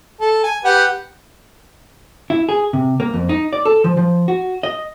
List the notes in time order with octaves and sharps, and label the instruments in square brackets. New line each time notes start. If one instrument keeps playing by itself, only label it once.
[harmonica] A4
G#5
G4 B4 F#5
[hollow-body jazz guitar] E4
G#4
C3
A#3
F2
D#4
D5
A4
F3
F3
F#4
D#5